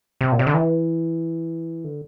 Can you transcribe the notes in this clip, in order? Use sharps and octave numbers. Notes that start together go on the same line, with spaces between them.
C3
A#2
C3
D3
E3
D3